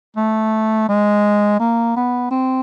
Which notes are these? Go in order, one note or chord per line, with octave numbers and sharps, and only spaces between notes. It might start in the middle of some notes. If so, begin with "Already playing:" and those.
A3
G#3
A#3
B3
C4